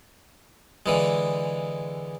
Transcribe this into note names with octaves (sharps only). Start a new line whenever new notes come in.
D3 E3 G#3